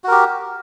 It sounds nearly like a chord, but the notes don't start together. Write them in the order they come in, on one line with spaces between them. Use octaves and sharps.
F#4 A#4 G4